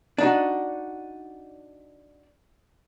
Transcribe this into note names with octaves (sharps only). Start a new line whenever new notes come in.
D4 D#4 F#4